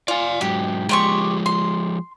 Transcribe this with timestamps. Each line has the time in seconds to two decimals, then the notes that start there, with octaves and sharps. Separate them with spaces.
0.08 F4 D5 G#5
0.41 G#2 F#3 G4
0.89 F3 G#3 G4 C6 C#6
1.46 C6